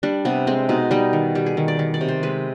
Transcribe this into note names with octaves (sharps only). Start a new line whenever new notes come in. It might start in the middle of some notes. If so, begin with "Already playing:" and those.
G3 D4
C3 B3
G#3 C4
B2 D#4
G3 D#4
D#3
G3 G4
G#4
D#3
D5
D#3
D5
C3
C5
G#3 B4